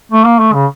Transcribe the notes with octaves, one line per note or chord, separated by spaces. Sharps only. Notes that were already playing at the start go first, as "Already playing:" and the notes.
A3
A#3
A3
C#3